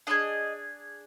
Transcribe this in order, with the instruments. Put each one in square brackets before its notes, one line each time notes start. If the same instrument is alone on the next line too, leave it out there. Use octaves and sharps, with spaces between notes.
[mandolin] D4 F4 G#4 D#5